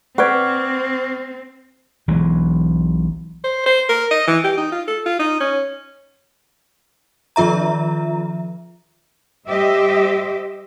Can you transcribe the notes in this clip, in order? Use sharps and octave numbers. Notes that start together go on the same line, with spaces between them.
C4 B4 D5 F#5 C#6 F6 G#6
B1 E3 G#3
C5
C5
A#4
D#5
E3
G4
D#4
F4
A4
F4
D#4
C#4
D#3 F3 F4 E5 A#5
G3 G4 C5 D#5 E5